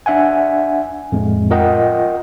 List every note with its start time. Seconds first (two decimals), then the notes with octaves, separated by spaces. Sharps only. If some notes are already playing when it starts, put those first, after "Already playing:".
0.06 D4 E5 F#5 G#5
1.12 F2 A2 G#3
1.51 F4 A#4 D#5 F#5 G5